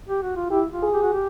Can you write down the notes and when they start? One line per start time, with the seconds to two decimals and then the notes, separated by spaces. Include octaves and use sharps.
0.09 G4
0.23 F#4
0.36 F4
0.50 E4 G4
0.72 F4
0.83 G#4
0.93 G4
1.02 F#4
1.13 G4